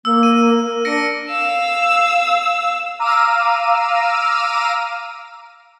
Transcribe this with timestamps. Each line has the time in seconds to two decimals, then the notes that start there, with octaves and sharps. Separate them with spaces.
0.05 A#3 E6
0.23 D#7
0.58 A#4
0.85 D4 A#6 C#7 D7
1.31 F5 E6
2.99 F5 A#5 D6 E6 F6 D#7